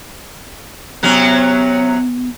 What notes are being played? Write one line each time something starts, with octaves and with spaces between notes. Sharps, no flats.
C3 F#3 B3 C#4